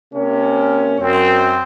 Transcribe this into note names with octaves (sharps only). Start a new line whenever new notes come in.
C3 A#3 C#4
F#2 C4